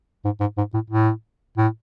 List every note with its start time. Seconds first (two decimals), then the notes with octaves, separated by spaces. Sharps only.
0.25 G#2
0.41 G#2
0.58 G#2
0.74 A2
0.90 A2
1.58 A2